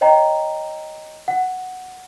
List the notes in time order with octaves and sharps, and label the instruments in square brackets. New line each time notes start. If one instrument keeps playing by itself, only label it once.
[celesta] C#5 D#5 G5 A#5
F#5